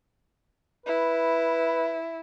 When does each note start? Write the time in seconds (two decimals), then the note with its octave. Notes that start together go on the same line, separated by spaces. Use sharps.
0.86 E4 B4